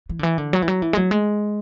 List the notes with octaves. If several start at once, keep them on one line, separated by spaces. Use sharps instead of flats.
E3
D3
E3
D3
F#3
E3
F#3
E3
G#3
F#3
G#3